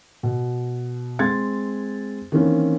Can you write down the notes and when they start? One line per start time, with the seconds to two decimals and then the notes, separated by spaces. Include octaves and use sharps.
0.23 B2
1.19 G#3 C4 C6 G#6 A6
2.32 D#3 E3 A#3 C4 C#4